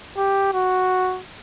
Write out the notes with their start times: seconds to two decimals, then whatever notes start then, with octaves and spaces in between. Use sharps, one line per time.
0.17 G4
0.54 F#4